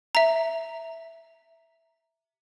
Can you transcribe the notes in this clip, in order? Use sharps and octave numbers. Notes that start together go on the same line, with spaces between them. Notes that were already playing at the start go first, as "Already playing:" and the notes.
E5 A#5